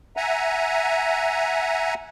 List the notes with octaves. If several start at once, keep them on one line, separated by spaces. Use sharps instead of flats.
E5 F#5 G#5 A#5